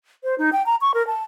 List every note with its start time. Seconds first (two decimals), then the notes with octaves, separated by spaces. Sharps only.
0.24 C5
0.38 D#4
0.53 G5
0.66 A#5
0.81 C#6
0.94 A#4
1.07 A5